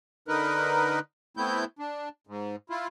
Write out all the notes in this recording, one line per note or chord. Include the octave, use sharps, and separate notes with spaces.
D3 D#4 A#4 B4
A3 B3 C4 E4 G6
D4
G#2
E4 F4